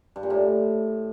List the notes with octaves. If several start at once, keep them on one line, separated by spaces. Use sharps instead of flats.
G2
A#2
A2